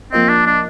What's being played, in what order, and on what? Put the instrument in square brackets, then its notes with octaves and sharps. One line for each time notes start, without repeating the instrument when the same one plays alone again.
[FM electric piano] F3 A#3 F4 A#4 D#5 [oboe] C4
[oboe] D4
D4